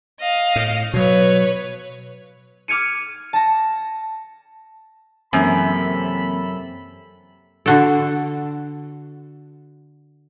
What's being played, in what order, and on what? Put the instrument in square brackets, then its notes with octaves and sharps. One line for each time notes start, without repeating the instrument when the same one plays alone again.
[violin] D#5 F5
[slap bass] A2
[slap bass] B2 F#3 [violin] B4 C#5
[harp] D6 F6 G#6 C#7 D#7
A5 A#6
[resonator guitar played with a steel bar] F#2 [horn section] C3 A4 B5 [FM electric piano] E3 A#3 C4
[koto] D3 F#4 A4